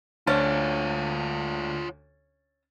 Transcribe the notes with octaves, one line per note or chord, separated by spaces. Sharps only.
D2 F3 C#4 D4 F4 C#5 A6